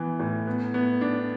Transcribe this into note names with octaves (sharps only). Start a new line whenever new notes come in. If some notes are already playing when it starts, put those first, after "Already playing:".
Already playing: E3 B3
A2
B3
B3
D4